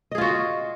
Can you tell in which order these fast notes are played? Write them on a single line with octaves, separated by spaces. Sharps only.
D#5 G#4 F4 F#4